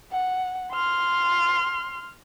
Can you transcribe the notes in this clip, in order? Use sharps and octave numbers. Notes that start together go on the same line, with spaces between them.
F#5
C6 F6